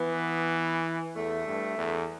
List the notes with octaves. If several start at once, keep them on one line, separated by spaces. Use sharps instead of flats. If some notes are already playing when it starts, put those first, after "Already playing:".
Already playing: E3 B3
E2 A3
G2
E2